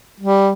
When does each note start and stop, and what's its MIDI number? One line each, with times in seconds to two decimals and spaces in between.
0.21 0.52 55